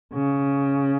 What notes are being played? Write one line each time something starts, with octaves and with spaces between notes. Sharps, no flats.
C#3